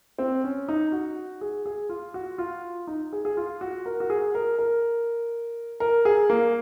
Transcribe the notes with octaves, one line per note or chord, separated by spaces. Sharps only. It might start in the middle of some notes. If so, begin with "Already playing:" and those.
C4
C#4
D#4
F#4
G#4
G#4
F4
F#4
F4
D#4
G#4
G#4
F4
F#4
A#4
F#4
G#4
A#4
A#4
A#4
G#4
A#3